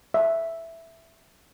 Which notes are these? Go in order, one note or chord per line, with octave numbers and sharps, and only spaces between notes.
E5